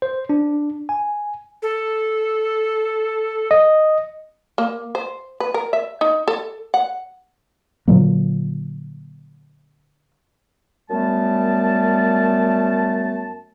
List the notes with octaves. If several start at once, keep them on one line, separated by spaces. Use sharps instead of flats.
C5
D4
G#5
A4
D#5
A#3
C5
B4
A#4
E5
D#4
A4
F#5
A#2 D3 F#3 A#3
F#2 G3 A3 B3 A5